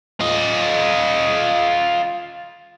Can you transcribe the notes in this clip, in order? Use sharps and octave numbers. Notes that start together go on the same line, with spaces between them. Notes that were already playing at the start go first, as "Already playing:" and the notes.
F4 D#5